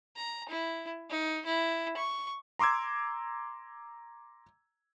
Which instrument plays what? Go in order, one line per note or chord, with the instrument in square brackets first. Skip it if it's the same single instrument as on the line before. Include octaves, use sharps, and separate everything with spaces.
[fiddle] A#5
E4
D#4
E4
C#6
[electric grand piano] A#5 C6 D6 E6 G#6